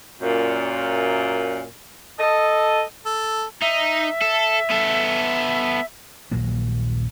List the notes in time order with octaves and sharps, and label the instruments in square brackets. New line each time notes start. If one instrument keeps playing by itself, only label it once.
[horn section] F#2 A#2
A4 D#5
[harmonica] A4
[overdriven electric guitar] D#4 [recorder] E5
[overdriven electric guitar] A4
B3 A4
[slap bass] D#1 A#1 F#3 A#3